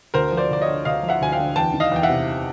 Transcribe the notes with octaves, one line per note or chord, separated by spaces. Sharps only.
D2 A#4 C5
F3
C5 D5
D2 D5
C#5 D#5
D3
D2 D#5 F5
F3
E5 F#5
D2 G#5
F5 G5
D3
E2 G5 A5
D#3
D#5 F5
E2 G5
E5 F#5
C3